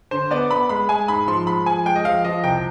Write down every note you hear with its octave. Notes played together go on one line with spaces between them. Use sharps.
D3 C5
B3 D5
B3 B5
G#3 B5
G#3 G#5
G#2 B5
F3 C6
G#3 B5
F3 G#5
G#3 G5
D#5
F3 F5
F3 D#5
C2 G5